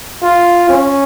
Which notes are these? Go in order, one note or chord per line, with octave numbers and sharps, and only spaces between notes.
F4
C#4